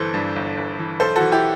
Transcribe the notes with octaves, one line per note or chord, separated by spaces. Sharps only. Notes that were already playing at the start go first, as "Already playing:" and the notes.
Already playing: G1 E3 A4 C5
G2
G1
G1
E3
B1 A4 C5
E3 F#4 A4
E4 G4